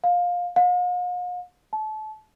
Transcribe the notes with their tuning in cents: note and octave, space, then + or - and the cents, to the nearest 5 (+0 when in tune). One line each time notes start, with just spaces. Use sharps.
F5 +20
F5 +45
A5 -30